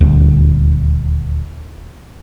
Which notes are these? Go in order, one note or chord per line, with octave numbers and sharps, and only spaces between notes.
D#1 D2